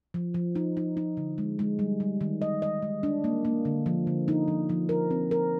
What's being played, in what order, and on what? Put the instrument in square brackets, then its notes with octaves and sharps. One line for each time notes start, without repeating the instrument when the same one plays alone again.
[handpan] F3
F3
D#4
D#4
D#4
D3
G#3
G#3
G3
G3
D#3
D#5
D#5
G#3
D4
A#3
A#3
D3
F3
D3
D#4
F3
F3
A#4
C4
A#4